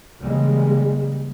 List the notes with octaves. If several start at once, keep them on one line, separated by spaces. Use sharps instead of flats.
C#3 E3 G3 G#3 A#3